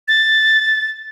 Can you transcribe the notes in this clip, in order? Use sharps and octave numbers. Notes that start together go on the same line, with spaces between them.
A6